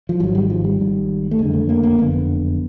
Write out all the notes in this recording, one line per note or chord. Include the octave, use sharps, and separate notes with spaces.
F3
G#1 G#2 F#3
G3
F3
G3
G#1 G#2
A3
F#1 F2 D3 G#3
A3
A#3
A#3
F#1 F2 D3 B3